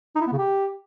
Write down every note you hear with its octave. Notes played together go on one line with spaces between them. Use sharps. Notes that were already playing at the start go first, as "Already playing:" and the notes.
D#4
E4
B3
C#3
G4